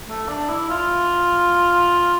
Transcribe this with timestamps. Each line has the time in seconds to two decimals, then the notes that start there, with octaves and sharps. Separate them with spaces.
0.09 A3
0.29 D4
0.49 E4
0.70 F4